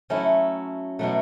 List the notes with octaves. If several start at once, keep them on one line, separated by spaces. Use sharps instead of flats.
F#3 A3 C#4 E4
B2 F#3 A3